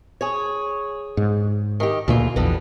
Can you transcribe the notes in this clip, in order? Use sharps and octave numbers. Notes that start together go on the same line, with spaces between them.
G#4 C#5
G#2
D#3 G4
D2 A#2 C#3 E3 A#3 F4
A#1 E2 D3 G3 B3